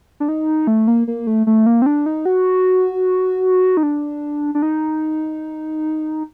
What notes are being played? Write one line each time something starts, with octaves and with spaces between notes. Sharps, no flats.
D4
D#4
A3
A#3
A#3
A3
A3
A#3
C4
D4
D#4
F#4
D#4
D4
D4
D#4